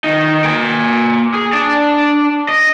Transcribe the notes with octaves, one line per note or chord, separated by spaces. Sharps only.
D#3 D#4
A#3 G#5
G#4
D4 D5
D#5